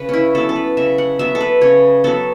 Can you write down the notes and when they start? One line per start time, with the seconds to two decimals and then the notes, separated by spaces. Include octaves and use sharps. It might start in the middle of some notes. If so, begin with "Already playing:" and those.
Already playing: C#3 B4
0.09 C#4 E4
0.35 F#3 B3 A4
0.49 A4
0.56 B4
0.77 C#3 E5
0.98 F#5
1.19 F#3 B3 E5
1.35 A4
1.41 B4
1.61 C#3 C#5
2.04 F#3 B3 A4